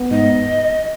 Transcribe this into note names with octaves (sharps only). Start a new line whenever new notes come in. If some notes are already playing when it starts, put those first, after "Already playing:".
Already playing: B3
G#2 D#5